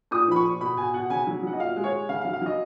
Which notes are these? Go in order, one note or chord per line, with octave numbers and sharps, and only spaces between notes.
A#2 D#6
F3 B5
C#6
A#2
B2 B5
B2 G#5
B2 F#5
C#3 G#5
F#3
F#3 F#5
D#5
A#2 F5
G#3
C#5
G#3
C#3 F5
F5
F#3
F5
F#3 D#5